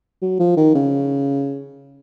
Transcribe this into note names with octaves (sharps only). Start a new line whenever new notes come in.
F#3
F3
D#3
C#3